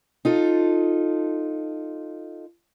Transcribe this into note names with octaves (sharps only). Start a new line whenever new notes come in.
D#4 F4 A4